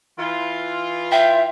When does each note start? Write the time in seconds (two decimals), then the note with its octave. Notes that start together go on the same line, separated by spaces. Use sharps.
0.19 E3 F4
1.12 E5 G5